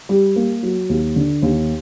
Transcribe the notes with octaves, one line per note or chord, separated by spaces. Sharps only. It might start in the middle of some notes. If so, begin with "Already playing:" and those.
G3
A#3
F#3
D#2
D3
D#2